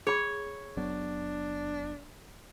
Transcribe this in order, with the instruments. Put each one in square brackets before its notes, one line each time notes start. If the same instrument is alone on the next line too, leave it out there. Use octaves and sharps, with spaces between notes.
[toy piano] G#4 B5 [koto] C#5
[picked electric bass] F#1 F#3 B3 [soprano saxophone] D4